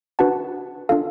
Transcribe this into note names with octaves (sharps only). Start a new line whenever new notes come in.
D4 F#4 B4 F#5 A5
D4 F4 A4 F5